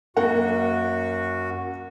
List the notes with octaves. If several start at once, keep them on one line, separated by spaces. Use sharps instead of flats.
F#2 A#3 F#4 A#4 F#5